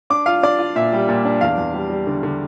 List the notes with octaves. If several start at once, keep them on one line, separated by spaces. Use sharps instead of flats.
D4 D6
F4 F5
D4 D5
F4
A#2 E5
G3
A#2
D4
E2 F5
E2
G3
G3
D3
D3